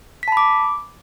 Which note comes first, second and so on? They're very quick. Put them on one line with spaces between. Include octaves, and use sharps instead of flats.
B6 A5 B5 D6